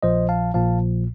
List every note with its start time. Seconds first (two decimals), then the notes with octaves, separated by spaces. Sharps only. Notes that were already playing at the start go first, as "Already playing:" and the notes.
0.03 A#1 A#2 F3 C5 D#5
0.29 F5 A5
0.54 A#1 A#2 F3 F5 A5